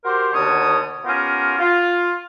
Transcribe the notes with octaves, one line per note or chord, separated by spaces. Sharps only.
F#4 G4 A#4 C5
D#2 B2 D3 C#5 D#6
B3 C#4 F4 G4 A#4
F4